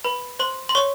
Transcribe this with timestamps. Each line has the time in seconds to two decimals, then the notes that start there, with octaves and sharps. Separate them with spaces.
0.04 B4 B5
0.39 C5 C6
0.69 C6
0.75 C#5 C#6